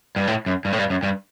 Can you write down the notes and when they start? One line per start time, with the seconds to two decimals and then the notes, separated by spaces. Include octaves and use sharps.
0.16 G2
0.27 A2
0.46 F#2
0.65 G2
0.72 A2
0.78 G2
0.90 F#2
1.03 G2